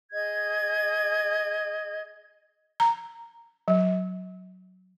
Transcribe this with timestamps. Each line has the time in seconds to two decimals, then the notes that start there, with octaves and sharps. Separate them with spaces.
0.11 G#4 D#5 G#6
2.80 A#5
3.68 F#3